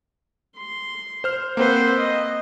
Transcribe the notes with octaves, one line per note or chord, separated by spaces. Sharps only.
C6
C5 F6
A#3 C4 B4 C5 F#5
D#5